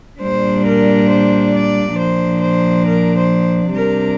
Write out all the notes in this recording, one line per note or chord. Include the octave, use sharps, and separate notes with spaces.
A#2 G3 D4 C5
A#4
C5
D5
A#2 F3 D4 C5
C5
A#4
C5
C3 G3 D4 A#4